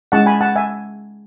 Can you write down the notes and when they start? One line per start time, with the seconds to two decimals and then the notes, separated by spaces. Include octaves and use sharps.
0.12 G#3 C#4 E4 F#5 A5
0.26 G#5 B5
0.41 F#5 A5
0.55 E5 G#5